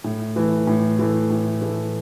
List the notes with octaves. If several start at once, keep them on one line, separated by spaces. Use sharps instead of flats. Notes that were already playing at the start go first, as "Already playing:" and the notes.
A2
E3 A3
A2
E3 A3
A2
E3 A3